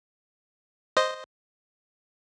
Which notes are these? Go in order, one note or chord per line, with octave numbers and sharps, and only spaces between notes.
C5 D#5